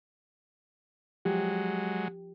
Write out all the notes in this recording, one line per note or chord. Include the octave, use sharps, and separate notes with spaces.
F3 F#3 G#3 G4